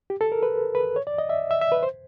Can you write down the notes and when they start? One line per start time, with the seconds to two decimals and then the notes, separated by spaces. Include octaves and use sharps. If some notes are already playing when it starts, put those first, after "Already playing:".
0.10 G4
0.21 A4
0.32 A#4
0.43 B4
0.75 B4
0.96 C#5
1.07 D5
1.18 D#5
1.29 E5
1.51 E5
1.61 E5
1.72 B4
1.83 C5